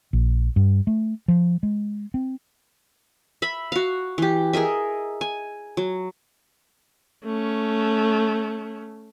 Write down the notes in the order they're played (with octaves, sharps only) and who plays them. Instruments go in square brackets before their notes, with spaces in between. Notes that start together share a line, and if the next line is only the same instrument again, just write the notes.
[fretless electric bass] A#1
G2
A3
F3
G#3
C4
[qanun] E5 B5
F#4 F5
E3 G4
G#4 A#4 D#5 E5
G#5
F#3
[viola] A3 C#4